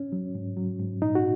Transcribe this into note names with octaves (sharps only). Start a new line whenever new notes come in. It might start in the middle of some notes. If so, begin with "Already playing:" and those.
Already playing: C#4
F#3
G#2
F#3
G#2
A#2 D#4
F#4